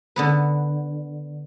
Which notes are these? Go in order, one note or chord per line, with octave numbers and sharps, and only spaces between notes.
D3 B3 B4